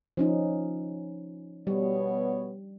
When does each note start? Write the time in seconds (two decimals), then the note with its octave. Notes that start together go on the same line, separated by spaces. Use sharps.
0.17 F3 C#4 D#4
1.67 B2 G3 B3 C#5